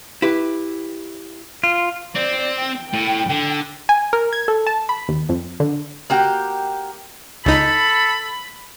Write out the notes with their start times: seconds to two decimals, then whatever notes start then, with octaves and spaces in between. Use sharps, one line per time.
0.22 E4 G4 B4
1.63 F4
2.15 C4 D5
2.59 G5
2.93 A2
3.29 D3
3.89 G#5
4.13 A#4
4.33 G#6
4.48 A4
4.67 A5
4.89 B5
5.09 D#2
5.29 F2
5.60 D3
6.10 A#3 F#4 G4 G5
7.46 C#2 D#4 A4 B5